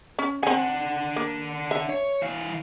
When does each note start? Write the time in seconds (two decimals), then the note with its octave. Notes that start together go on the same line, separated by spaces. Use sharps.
0.19 C#4
0.43 C4 D4 F#5 G#5
1.16 A#3
1.71 E5
1.89 C#5
2.22 E3 F5